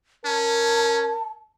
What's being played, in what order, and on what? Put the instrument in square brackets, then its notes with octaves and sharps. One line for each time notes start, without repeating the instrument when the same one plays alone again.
[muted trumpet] C#4 [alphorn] A#4 [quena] A5